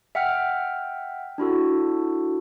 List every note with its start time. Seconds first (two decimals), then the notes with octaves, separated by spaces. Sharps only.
0.15 E5 F#5 G5 F6
1.38 D4 E4 F#4 A4